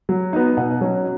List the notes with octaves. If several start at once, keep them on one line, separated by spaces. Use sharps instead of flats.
F#3
B3 D#4
B2 F#5
F#3 C#4